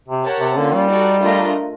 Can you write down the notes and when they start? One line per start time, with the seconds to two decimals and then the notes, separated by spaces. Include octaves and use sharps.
0.08 C3
0.24 G4 A#4 C#5 F#5 A5
0.40 C3
0.57 D3 A#3 C#4 F4
0.74 G3
0.89 D#4 F#4 A4 D5
1.22 A3 D4 F4 A#4 D#5